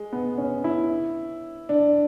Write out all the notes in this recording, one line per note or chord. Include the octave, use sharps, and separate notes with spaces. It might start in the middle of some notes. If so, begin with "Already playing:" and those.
Already playing: G#3
B3
C#4
E4
D4